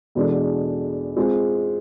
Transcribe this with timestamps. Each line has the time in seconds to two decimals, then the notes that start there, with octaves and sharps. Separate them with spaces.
0.15 E2 B2 G#3 D4 A4
1.17 G#3 C4 F4 G#4